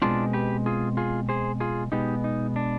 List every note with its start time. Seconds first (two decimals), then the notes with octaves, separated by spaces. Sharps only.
0.02 B2 G#3 C4 D4 F4
0.33 G4 B4
0.66 F4 G#4
0.97 F4 G#4
1.29 G#4 C5
1.60 F4 G#4
1.92 B2 G#3 B3 D#4 G4
2.24 D#4
2.56 D4